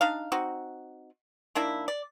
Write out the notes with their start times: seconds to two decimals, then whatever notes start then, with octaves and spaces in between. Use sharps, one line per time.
0.01 D4 D#4 F5
0.32 C4 D#4 F#4
1.55 D#3 A#3 D4 E4
1.88 D5